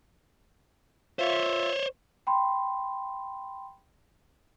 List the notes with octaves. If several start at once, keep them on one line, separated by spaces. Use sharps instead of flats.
F4 C5 C#5 E5
G5 B5 C6